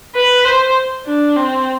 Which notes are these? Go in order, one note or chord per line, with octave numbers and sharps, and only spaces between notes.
B4
C5
D4
C4